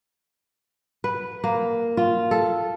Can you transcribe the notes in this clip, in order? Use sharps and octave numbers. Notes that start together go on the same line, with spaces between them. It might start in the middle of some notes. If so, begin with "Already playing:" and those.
B4
A#3
F4
A4